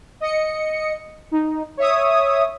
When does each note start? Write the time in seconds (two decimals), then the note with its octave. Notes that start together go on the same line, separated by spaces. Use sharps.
0.20 D#5 C#7
1.31 D#4
1.77 C#5 E5 D#6